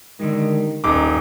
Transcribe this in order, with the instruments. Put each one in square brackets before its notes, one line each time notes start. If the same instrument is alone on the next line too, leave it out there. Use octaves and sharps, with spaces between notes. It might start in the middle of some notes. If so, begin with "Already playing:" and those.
[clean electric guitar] D3 G3 G#3 [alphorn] D#3
[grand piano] D#1 D6 [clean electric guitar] G2 A#4 [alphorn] D#4